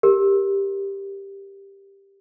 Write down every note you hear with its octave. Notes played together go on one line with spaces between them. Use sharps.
G4 A#4